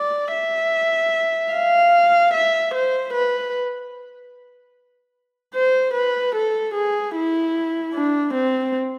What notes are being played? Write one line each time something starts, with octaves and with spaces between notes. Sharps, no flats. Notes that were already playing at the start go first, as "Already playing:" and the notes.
Already playing: D5
E5
F5
E5
C5
B4
C5
B4
A4
G#4
E4
D4
C4